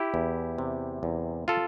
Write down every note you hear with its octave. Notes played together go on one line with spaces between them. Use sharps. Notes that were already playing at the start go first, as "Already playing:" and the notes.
Already playing: E4 G4
E2
C3
E2
F4 A4